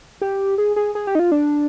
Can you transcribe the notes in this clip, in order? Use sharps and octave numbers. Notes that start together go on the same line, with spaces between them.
G4
G#4
G#4
G#4
G4
D#4
F4
D4